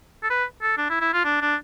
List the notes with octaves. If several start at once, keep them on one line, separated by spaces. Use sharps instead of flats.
A4
B4
A4
D4
E4
E4
F4
D4
D4